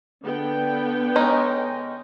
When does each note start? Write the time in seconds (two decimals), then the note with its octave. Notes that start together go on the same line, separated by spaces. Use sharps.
0.22 D3 B3 G5
1.16 G#3 C#4 D#4